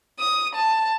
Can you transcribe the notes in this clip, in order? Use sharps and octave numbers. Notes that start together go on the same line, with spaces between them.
D#6
A5